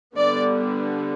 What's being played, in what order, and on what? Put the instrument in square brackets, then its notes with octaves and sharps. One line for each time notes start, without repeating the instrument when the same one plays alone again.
[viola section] D3 G3 B3 D5